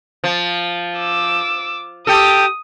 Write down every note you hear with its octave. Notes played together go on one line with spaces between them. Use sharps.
F3
D6 E6
G4 A4 D#6